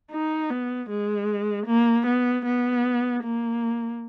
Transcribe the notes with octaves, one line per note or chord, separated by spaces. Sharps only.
D#4
B3
G#3
A#3
B3
B3
A#3